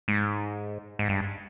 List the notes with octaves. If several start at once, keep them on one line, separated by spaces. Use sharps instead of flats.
G#2
G#2
G2